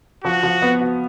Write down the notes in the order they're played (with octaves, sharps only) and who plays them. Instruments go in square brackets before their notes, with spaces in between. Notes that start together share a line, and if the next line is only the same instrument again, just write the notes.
[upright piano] F3 [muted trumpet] F#4
[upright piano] F3
B3
F#4